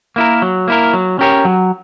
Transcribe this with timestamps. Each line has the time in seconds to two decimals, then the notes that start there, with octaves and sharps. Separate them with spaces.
0.16 A#3 E4 A#4
0.42 F#3
0.68 A#3 E4 A#4
0.94 F#3
1.19 C#4 G4 A#4 C#5
1.45 F#3